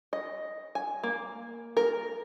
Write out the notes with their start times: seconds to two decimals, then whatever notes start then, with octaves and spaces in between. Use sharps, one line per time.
0.13 D#5
0.75 G#5
1.03 A#3
1.77 A#4